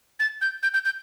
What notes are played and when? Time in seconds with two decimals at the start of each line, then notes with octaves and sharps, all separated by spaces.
0.20 A6
0.41 G6
0.63 G6
0.74 G6
0.85 G6